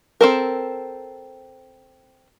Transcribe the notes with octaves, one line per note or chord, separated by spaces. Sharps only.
C4 A4 A#4